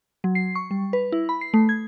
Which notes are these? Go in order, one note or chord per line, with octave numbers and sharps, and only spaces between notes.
F#3
C7
C#6
G3
B4
E4
B5
C7
A3
G#6